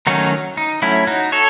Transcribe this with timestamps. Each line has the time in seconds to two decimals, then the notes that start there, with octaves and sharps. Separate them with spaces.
0.07 D#3 F#3 A3 C#4 D#4 F#4
0.57 D#4
0.82 F#3 A3 C#4 E4
1.07 D#4 F#4
1.32 A4 C#5